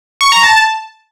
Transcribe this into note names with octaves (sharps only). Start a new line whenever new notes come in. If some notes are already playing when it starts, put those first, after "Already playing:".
C#6
A#5
A5